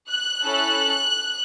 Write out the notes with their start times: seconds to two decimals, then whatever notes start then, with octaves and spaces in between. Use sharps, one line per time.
0.10 F#6
0.42 C#4 E4 A4